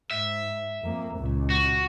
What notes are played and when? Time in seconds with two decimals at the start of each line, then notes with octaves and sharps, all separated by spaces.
0.11 G#2 E5
0.82 F2 A#3
1.17 C#2 A#2
1.50 F#4